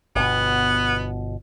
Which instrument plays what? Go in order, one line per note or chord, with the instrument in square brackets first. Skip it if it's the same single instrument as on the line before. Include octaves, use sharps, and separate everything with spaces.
[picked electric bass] G1 B2 [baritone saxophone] B3